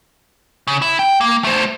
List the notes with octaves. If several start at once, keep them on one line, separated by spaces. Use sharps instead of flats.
C#3
E4
G5
A#3
A3 C5